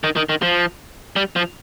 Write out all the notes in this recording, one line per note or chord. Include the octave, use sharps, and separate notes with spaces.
D#3
D#3
D#3
F3
G3
F3